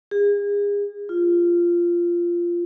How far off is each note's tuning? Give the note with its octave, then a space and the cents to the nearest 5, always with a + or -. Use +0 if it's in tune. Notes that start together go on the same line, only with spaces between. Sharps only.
G#4 -35
F4 -10